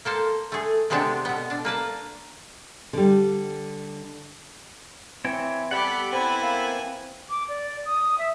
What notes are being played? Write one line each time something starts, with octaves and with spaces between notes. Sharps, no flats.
A#3 A4 C5
A3 G#4
C3 G#3 B3 C4 D4
B2 B3
D4
A#3 B4 A5
D3 G3
E3 C4 C#5 G5
G3 B3 G4 A4 F#5 B5
C4 E4 B4 G#5
A#3
D6
D5
D#6
E5